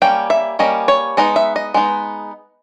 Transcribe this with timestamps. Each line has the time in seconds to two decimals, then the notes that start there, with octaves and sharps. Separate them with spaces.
0.02 G3 A#3 C#4 G5
0.30 E5
0.59 G3 A#3 C#4 D#5
0.88 C#5
1.17 G#3 B3 D#4 D#5
1.36 E5
1.56 D#5
1.74 G#3 B3 D#4